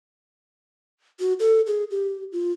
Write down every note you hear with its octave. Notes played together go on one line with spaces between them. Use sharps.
F#4
A4
G#4
G4
F4